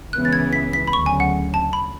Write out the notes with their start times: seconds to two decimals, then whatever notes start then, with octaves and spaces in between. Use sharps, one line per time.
0.12 C#2 C#3 E3 B3 F#6
0.25 A6
0.33 G#6
0.53 B6
0.73 B6
0.88 B5
0.93 D2 C#3 F#3 C#6
1.06 G#5
1.20 F#5
1.54 A5
1.73 B5